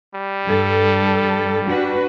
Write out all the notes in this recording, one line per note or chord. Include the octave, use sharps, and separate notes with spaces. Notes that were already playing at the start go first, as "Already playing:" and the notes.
G3
G2 A4
D4 F#4 B4